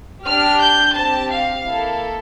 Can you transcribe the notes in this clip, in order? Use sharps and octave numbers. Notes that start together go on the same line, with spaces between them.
D4 G4 F6
G6
C4 G4 A5
F5
A#3 E4 A4